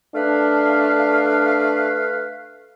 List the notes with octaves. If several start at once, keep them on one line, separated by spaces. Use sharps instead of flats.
A3 D4 B4 F5